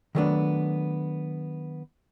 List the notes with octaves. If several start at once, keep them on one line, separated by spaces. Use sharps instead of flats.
D#3 F#3 G3 A3 B3 D4